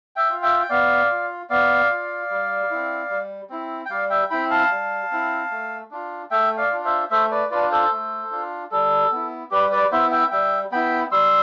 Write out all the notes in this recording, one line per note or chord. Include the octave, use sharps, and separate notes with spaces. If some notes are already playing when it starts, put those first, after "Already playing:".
E5 G5
F4
E5 G5
G5
B3 D5 F5
F4
B3 D5 F5
F4
G3
C4 E4
G3
C4 E4
G5
G3 D5 F5
E5 G5
C4 E4 G5 B5
F5 A5
G3
C4 E4
A3
D4 F4
A3 E5 G5
D5 F5
D4 F4
C5 E5
A3 C5 E5
B4 D5
D4 F4 B4 D5
A4 C5
A3
D4 F4
G3 A4
B3 E4
G3 G4 B4
B4 D5
B3 E4 C5 E5
E5 G5
G3 E5 G5
B3 E4 G5 B5
G3 C6 E6